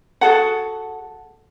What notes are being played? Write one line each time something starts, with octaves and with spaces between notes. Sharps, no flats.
F#4 G#4 A4 F#5